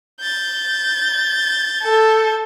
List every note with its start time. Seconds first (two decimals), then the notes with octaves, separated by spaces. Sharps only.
0.20 G6 A6
1.83 A4